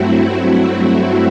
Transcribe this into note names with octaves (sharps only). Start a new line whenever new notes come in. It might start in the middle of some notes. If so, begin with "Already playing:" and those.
Already playing: G2 F#3 A3 C4 E4 F#4